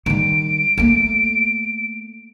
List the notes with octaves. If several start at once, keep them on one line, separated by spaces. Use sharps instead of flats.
D#3 G3 D7
A3 A#3